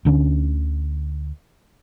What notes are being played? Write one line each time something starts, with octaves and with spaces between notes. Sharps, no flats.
D2 D3 B3 C#4